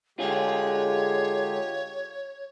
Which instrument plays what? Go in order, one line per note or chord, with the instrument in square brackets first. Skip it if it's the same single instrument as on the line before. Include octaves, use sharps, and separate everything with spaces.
[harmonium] D3 G#3 G4 [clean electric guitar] F4 G#4 [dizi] C#5